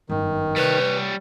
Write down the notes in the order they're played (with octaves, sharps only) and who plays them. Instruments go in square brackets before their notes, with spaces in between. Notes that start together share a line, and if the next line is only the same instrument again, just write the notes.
[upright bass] G1 F#2 [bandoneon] D#3
[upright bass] C3 [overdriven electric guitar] G3 C#5 [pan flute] B4